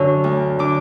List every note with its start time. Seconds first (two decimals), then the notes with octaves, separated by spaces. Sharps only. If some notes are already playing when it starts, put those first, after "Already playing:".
Already playing: F#2 D3 C#6
0.24 D2
0.59 D3 D6